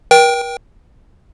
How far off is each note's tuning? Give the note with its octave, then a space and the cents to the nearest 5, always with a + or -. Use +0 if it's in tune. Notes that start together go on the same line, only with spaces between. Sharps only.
A#4 +45 G5 +0